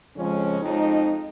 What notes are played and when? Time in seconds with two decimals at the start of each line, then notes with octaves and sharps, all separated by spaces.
0.15 F2 C#3 F3 G#3 C#4
0.61 F2 F3 G#3 D#4